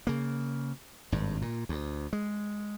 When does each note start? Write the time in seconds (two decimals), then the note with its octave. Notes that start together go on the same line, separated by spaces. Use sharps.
0.07 C#3 A#3
1.12 G#1 G2
1.42 A#2
1.69 D2
2.13 G#3